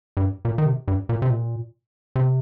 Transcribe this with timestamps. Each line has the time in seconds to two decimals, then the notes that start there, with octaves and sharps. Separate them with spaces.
0.17 G2
0.45 A#2
0.58 D#3
0.66 C3
0.88 G2
1.09 A#2
1.22 C3
1.30 A#2
2.16 C3